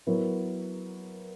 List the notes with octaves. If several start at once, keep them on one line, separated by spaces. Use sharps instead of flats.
F#3 B3 E4 A#4